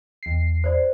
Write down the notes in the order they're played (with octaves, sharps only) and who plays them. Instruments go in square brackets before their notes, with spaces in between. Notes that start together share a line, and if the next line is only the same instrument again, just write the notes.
[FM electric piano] E2 C7
[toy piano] C5 D5